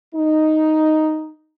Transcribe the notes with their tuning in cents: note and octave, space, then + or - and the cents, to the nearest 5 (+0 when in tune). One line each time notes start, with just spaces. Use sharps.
D#4 +0